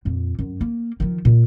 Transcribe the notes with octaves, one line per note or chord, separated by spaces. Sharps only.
F2 A#2
F#2
A#3
D#3 F3
A#2